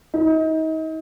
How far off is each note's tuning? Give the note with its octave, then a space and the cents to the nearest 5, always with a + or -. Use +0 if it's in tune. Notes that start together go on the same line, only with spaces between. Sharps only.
D#4 +35